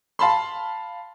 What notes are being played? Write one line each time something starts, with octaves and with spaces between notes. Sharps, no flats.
F5 A5 B5 C6